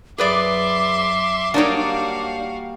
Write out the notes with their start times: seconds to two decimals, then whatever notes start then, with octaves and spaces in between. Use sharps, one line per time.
0.18 F#2 G#4 B4 D5 E5 C6 D6
1.54 G3 A#3 D4 D#4 F#4 C#5 F5